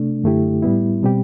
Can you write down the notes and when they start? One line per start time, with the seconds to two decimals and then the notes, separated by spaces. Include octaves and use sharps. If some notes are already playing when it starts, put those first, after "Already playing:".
Already playing: C3 A3 D4
0.24 F#2 D3 A3 E4 G4
0.62 A2 G3 B3 E4
1.03 B2 G3 C4 G4